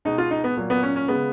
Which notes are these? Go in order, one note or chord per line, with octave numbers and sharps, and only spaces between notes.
B2 G#3 D#4
F4
D#4
B3
A#2 F#3
B3
C#4
C#4
C#3 G#3 B3